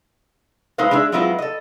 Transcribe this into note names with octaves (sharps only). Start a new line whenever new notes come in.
G#3 D#4 E4 B4 C5 F5
G#3 D4 G#4 E5
F#3 G#3 C4 E4 F4 B4
A4 D#5